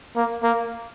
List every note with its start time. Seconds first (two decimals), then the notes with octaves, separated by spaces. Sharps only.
0.16 A#3
0.43 A#3